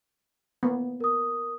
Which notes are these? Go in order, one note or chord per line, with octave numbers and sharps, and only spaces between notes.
A#3 B3
A#4 D#6